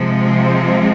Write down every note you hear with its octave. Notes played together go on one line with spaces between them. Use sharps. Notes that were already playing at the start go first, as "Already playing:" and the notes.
Already playing: C3 F3 G#3
C4